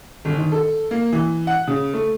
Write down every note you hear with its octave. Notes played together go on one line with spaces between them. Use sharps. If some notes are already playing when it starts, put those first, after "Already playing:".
G1
D#3
A4
A#3
E3
F#5
C#3
A3